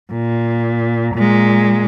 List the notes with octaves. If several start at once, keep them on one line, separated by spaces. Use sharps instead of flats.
A#2
A#2 G#3